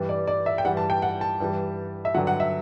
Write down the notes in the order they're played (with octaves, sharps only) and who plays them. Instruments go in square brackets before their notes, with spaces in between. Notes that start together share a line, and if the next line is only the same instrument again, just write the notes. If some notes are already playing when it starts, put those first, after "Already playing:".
Already playing: [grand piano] G2 E3 G3
D5
D5
E5
G5
G2 E3 G3 F#5
A5
G5
F#5
A5
G2 E3 G3
E5
G2 D3 F#3 F#5
F#5
E5